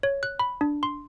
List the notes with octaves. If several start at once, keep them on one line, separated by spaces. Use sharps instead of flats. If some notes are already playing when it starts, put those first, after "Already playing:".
C#5
F#6
B5
D4
C6